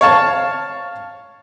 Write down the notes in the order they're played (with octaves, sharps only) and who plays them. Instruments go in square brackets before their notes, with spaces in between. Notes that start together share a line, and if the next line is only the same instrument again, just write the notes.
[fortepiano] C#5 F5 A5